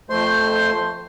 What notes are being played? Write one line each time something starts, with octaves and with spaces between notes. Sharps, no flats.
F2 A3 C5 C6